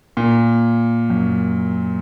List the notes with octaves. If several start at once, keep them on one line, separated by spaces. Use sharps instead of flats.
A#2
F#2